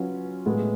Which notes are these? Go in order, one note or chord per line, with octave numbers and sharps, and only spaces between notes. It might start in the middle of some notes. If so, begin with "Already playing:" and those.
Already playing: F#3 C#4 F4 B4
A2 G#3 B3